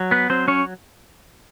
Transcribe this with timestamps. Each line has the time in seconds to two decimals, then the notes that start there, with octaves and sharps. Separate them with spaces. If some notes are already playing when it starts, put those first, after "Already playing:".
Already playing: F#3
0.11 B3 B4
0.30 F#3 C4 C5
0.48 C#4 C#5